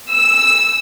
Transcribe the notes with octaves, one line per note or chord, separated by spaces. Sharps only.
E6